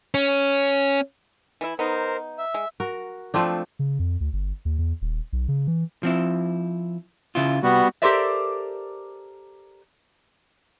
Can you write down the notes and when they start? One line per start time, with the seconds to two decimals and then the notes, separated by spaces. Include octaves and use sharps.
0.14 C#4
1.61 E3 E4
1.79 B3 D#4 A#4 C5
2.38 E5
2.54 G#3
2.80 F#4 A#4
3.34 F3 A3 C4 D4
3.79 C#3
3.99 F2
4.21 D2
4.33 G1
4.65 D#2
4.78 E2
5.02 D#1
5.33 B1
5.48 C#3
5.67 E3
6.03 F3 C4 E4
7.35 C#3 E4 F4
7.63 C2 G3 B3 F#4
8.02 G4 A4 A#4 C5 D5 E5